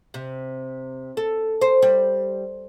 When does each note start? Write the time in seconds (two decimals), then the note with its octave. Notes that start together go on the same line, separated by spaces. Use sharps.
0.14 C3
1.17 A4
1.61 C5
1.82 G3